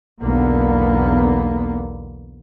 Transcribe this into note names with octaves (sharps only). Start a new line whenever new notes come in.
B1 E2 D3 A#3 B3